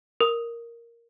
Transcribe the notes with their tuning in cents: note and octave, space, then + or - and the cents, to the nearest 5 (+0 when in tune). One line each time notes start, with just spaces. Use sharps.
A#4 +0 D#6 +0